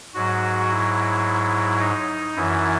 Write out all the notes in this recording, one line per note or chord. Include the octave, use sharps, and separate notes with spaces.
G#2 F#3 F#4
E4
D#4
F#2 E3 E4